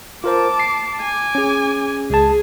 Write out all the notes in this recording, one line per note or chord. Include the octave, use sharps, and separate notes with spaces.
F4 A#4 C5 A5 D6
C7
G#5 D6
C#4 G#4
C#2 G#4 A5